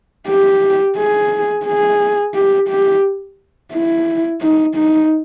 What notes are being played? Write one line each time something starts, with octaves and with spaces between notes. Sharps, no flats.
G4
G#4
G#4
G4
G4
E4
D#4
D#4